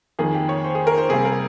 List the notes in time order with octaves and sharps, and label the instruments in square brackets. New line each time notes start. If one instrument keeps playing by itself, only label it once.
[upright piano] F2 D#3 A#3 G#4
G4
C#5
C5
G#4
A#4
C5
C3 G3 A#3 G#4
A#4